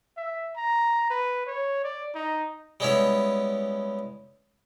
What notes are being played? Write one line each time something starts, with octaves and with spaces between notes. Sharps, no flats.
E5
A#5
B4
C#5
D5
D#4
G3 G#3 B3 C#4 E4 C#5